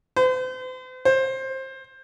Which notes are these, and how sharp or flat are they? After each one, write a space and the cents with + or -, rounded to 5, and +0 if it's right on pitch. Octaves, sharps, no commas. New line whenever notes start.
C5 -40
C5 +20